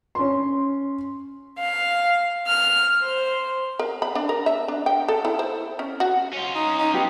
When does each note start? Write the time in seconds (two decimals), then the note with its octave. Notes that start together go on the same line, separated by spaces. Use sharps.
0.15 C#4 C6
1.59 F5
2.46 F6
3.01 C5
3.79 A#4
4.02 B5
4.15 D4
4.29 A#4
4.46 E5
4.68 D4
4.86 G5
5.08 A4
5.25 E4
5.39 C5
5.79 C#4
6.00 F#4
6.33 C#4 F4
6.55 D#4
6.78 D#4
6.94 B3 G4